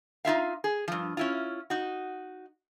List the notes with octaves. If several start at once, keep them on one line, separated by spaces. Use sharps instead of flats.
D#4 F4 E5 F5
G#4
G2 F3
C#4 E4 F4
D#4 F#4